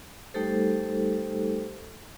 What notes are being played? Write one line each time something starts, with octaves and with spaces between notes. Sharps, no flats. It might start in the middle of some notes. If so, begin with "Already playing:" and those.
G3 A3 D#4 G4 A4 C5